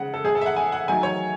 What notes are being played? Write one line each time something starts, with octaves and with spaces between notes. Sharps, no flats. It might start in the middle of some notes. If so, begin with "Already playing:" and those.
Already playing: C#3 G#3 F#5
A4
A2 G#3 G#4
A4
E5
F#5
G#5
F#5
D#3 F#3 A3 G#5
C#5